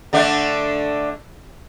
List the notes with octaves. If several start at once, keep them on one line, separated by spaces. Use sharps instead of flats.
D3 A3 D4